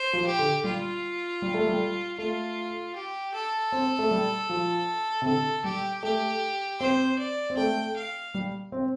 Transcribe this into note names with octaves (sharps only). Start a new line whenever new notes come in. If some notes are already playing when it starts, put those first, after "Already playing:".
Already playing: C5
F3
G4
D3
G3 F4
G3
A3
G3
A3 F4
G4
A4
C4
A3
G3
F3
C3
D3 A4
G3 G4
A3 G4
C4 C5
D5
C4
A3 G5
F5
G3
C4